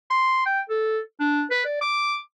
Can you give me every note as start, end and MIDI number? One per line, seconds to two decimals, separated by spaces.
0.10 0.43 84
0.46 0.60 79
0.69 1.00 69
1.20 1.43 62
1.51 1.62 71
1.65 1.76 74
1.81 2.17 86